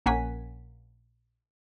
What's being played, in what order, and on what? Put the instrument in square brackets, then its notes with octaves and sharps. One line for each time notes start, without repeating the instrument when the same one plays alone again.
[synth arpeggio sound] A#1 A#3 C#4 F#5 G#5 B6